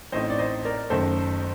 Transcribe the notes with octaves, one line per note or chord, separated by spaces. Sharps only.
A1 A2 A3 C4 D#4 C5 D#5
D5
C5 D#5
A#4 D5
F#1 F#2 D#3 A3 A4 C5